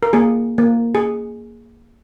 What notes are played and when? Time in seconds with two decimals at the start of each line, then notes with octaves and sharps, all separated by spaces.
0.03 A#4
0.13 A#3 G#4
0.58 A#3
0.95 G#4